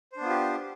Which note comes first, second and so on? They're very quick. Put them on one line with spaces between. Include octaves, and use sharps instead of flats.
C5 D4 B3 F4 G4